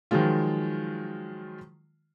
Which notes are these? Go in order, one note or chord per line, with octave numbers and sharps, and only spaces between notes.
D#3 F3 F#3 G#3 F4